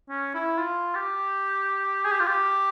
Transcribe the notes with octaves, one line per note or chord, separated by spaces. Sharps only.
C#4
E4
F4
G4
G#4
G4
F4
G4